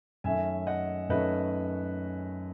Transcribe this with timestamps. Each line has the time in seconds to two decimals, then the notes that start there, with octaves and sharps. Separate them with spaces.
0.24 F#2 D#3 A3 C#4 E5 G#5
0.67 D#5 F#5
1.09 F#2 D#3 A3 C#4 B4 D#5